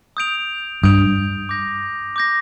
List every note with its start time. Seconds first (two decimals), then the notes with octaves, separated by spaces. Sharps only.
0.17 D#6 G6 D7 F7
0.83 G2 D#6 G6 D7 F7
1.49 D6 G6 A#6
2.16 D6 G6 A#6